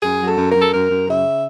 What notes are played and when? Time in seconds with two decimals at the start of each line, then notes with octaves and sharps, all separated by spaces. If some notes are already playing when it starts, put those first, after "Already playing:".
0.03 F#2 G#4
0.21 F#3
0.26 A4
0.38 F#2
0.50 F#2 A#4
0.62 A4
0.73 F#2 A#4
0.90 F#2
1.08 C#3 E5